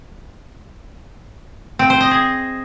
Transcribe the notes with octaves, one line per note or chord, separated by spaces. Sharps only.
C4
C5
D#5
G#4